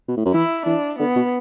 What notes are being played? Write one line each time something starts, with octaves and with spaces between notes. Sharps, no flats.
B2
A2
F#2
E3 E4
E3 D4
D3 B3
B2